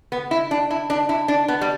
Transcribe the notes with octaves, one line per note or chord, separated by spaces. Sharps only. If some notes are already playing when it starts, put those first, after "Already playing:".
B3
E4
D4
E4
D4
E4
D4
B3
G3